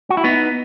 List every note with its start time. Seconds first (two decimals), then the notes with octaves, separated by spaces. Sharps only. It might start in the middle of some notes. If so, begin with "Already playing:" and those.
0.10 F#4
0.17 E4
0.24 B3 D#4